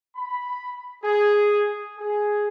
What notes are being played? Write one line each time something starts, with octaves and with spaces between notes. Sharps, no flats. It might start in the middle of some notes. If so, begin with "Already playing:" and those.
B5
G#4
G#4